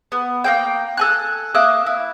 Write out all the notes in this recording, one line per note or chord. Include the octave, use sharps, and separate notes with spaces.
B3
A#3 C4 G5
A4 G#5 F#6
A#3 E5 D#6 F#6
E4